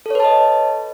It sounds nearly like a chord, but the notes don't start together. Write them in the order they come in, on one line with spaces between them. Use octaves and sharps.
A4 C#5 B4 A5 D#5